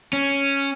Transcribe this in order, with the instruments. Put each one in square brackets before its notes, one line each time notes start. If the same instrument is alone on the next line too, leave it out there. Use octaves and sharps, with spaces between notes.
[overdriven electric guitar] C#4